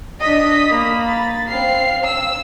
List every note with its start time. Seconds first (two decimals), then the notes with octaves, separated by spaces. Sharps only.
0.21 D4 D#5 D#6 B6
0.68 A#3 B5
1.07 A6
1.48 C4 F5 C7
2.04 E6